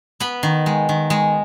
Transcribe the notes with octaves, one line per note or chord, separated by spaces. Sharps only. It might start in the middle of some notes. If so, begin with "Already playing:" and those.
B3 B5
D#3
G#3
D#3
G#3